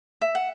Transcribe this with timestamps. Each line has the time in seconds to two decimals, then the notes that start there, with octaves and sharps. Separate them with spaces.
0.21 E5
0.35 F#5